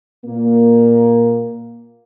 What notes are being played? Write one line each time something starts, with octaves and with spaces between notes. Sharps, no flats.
A#2 A#3